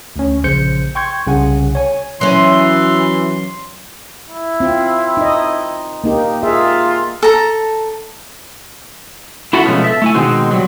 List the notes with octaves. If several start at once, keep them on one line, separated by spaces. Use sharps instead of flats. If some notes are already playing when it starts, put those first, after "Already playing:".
D2 C#4
A#1 C#3 C5 G6 C#7
G5 C6 C#6 G6 G#6
C2 C#3 F#5 G#5
C#5 G#5
E3 F#3 C#4 C6
E4
C4 F4
D#4 D#5
A#3 D#4 G4
F4 G#4 E5
A4 A#5
E4 F#4 A4 E5 F#5
B2 F3 G#3 A3 B3 C#4
A4 E5
A3 E4 G#5
B2 D#3 G#3 C4 F#4
F#3 G3